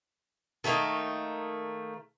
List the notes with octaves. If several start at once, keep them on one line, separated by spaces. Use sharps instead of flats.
D#3 A3 A#3 D#4